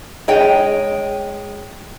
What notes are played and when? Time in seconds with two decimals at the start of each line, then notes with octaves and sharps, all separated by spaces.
0.28 G#3 C#5 D#5 G5